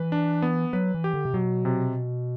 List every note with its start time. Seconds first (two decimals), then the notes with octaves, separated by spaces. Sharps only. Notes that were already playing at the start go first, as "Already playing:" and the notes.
Already playing: E3 B4
0.12 D4
0.42 B3
0.73 F#3 B4
0.94 E3
1.04 G4
1.14 D3
1.25 C3
1.34 B2 F#3
1.65 C3